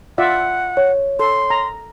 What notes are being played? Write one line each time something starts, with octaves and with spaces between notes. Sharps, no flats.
F4 D5 E5 F#5
C#5
A4 C6
A#5